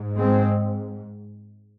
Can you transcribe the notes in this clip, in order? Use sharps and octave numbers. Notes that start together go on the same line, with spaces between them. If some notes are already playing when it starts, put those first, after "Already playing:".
Already playing: G#2
G#3 C4